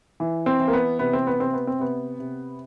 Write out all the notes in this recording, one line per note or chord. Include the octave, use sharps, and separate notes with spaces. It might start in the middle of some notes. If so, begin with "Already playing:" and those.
E3
C4
E3
A#3
B3
C3 B3
C4
B3
C3 C4
B3
C4
C3 B3
C3